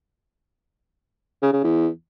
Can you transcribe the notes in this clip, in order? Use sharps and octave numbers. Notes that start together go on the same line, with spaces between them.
C#3
C#3
E2